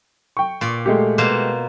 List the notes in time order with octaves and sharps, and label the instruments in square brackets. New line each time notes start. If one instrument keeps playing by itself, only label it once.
[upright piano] G5 C#6
[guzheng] A#2 D5
[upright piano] G#3 A3 G4
[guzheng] B2 A#3 C5